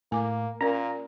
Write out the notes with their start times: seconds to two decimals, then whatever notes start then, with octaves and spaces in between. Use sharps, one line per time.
0.12 A2 A#3 G#5 D6
0.61 A#2 C#4 A#4 A#5